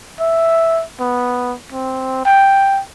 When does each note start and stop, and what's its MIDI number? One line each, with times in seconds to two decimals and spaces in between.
0.20 0.83 76
1.00 1.55 59
1.72 2.21 60
2.25 2.81 79